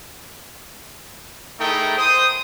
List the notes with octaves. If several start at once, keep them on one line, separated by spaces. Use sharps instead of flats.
A3 D#4 E4 G#4 A#4 G5
C5 D#6